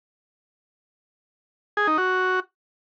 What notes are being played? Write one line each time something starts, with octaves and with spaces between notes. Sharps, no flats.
G#4
D#4
F#4